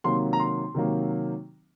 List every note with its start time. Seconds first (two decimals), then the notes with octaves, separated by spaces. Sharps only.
0.04 C3 D#3 F#3 A#3 C6
0.33 A#5
0.39 C6
0.74 C3 D#3 F#3 A#3